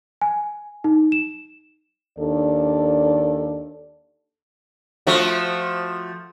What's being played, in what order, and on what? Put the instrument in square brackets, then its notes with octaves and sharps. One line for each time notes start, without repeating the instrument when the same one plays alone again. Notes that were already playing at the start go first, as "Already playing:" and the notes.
[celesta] G#5
D#4
E7
[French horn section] D#2 D4 A4 D5
[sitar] F3 A3 F#4